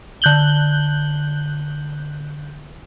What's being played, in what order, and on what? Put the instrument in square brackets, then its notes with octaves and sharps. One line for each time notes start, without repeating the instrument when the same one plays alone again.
[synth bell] D3 F#6 G6 F#7 G7